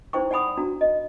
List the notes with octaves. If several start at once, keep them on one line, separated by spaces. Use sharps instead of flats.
D#4 E4 C5 G5 C#6
D5 F#5 G#5 B5 D#6
D4 F#4 A#5
D#5